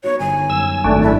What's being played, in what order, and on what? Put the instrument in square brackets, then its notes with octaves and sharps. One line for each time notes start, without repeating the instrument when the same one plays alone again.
[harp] B3 D#4 F#4 [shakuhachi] C#5
[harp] G1 [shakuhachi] G#5
[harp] F#2 [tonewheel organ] E6
[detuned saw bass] G#1 [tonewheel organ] A3 D4
[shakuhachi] E4